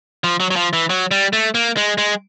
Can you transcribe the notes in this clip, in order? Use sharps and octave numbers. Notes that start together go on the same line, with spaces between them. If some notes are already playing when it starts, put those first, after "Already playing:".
F3
F#3
F#3
F3
E3
F#3
G3
A3
A#3
G#3
G#3